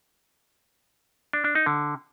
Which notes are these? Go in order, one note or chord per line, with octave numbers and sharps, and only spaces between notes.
D4
D4
D#4
D3